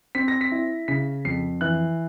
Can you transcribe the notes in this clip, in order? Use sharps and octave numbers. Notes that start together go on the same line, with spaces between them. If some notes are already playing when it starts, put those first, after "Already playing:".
C4 B6
A#6
B6
E4
C#3 B6
F2 C7
E3 F#6